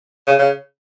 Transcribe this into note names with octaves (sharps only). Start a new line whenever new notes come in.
C#3
C#3